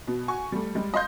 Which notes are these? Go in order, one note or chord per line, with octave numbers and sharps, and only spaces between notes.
B2
F#4 G#5 C#6
G3 A3
G3 G#3
D#5 F5 C6 G6